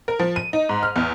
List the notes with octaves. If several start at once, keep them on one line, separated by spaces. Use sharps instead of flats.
A#4
F3
D#7
D#4
G#2
F6
E2